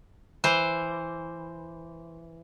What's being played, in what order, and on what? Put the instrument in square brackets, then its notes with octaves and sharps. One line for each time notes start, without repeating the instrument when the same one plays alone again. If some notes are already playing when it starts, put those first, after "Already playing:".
[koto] E3 C5